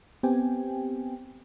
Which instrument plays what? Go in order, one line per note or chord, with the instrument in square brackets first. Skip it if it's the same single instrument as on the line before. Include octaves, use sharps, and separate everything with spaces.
[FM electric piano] B3 C4 G4 G5 G#5